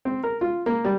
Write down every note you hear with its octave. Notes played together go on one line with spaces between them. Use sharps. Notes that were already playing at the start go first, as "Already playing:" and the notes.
C4
A#4
F4
A#3
G3